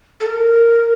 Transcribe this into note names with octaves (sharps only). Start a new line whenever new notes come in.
A4
A#4